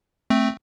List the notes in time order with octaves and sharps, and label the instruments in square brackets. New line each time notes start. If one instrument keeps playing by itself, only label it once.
[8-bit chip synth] A3 C4